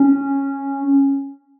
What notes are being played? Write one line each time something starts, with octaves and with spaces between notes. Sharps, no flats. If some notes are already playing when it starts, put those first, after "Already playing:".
Already playing: C#4